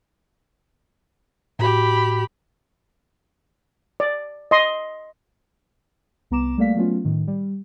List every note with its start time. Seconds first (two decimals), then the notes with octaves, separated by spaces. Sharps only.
1.59 A2 F#4 G4 B5
4.00 D5
4.51 D#5 C6
6.31 C2 B3 A#5 D6 E7
6.57 G3 A3 A#3 D5 F5 B6
6.76 F#3 A3 B3 C#4 F4
7.05 A2 D#3
7.27 G3